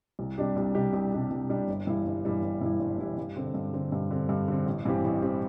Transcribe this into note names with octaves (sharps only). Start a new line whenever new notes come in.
C2
C3 G3 D4 G4
C2
C3 G3 D4 G4
C2
C3 G3 D4 G4
C2
C3 G3 D4 G4
G1
G2 E3 G3 E4
G1
G2 E3 G3 E4
G1
G2 E3 G3 E4
G1
G2 E3 G3 E4
G2
D3 C4
G2
D3 C4
G2
D3 C4
G2
D3 C4
A1
G2 E3 C4 G4
A1
E3 C4 G4